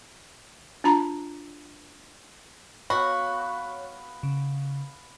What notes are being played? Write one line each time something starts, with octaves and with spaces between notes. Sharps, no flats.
D4 F4 A#5 B5
B3 F#4 C#5 F5 B5
C#3